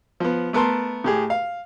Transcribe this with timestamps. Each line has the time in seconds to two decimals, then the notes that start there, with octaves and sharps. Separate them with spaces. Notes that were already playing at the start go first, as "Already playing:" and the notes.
0.20 F3 B3
0.53 A3 B3 A#4 A5 C6
1.04 A2 G4 G#4
1.30 F5